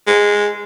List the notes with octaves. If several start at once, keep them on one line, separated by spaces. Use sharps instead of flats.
G#3